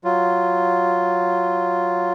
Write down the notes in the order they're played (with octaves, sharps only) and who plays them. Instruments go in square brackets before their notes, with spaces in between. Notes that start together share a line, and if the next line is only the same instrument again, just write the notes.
[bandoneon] F#3 F4